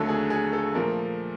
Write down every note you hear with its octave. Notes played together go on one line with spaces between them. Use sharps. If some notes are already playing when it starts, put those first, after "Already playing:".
Already playing: D#2 D3 F#3 A3 A4
G#4
G#4
A4
A#2 F3 A3 A#4